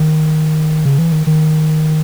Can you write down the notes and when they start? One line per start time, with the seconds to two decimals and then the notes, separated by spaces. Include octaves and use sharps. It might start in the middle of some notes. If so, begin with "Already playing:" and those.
Already playing: D#3
0.85 C#3
0.98 E3
1.12 D#3
1.27 D#3